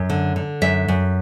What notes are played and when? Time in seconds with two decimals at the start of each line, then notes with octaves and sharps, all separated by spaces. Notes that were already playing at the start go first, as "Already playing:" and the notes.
Already playing: F#2
0.10 D3
0.36 D3
0.62 F#2 E5
0.88 F#2